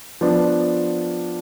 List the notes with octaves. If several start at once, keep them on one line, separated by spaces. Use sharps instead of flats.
F3 B3 D4